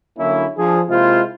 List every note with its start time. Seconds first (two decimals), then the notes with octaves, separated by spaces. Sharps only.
0.18 D3 F#3 A#3 C#4 E4
0.58 F3 D4 G#4
0.89 C3 G#3 A#3 E4 F4 C5